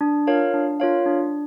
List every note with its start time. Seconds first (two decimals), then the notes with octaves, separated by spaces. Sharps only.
0.01 D4
0.27 F4 A#4 C#5 F5
0.54 D4
0.80 F4 A#4 C#5 F5
1.06 D4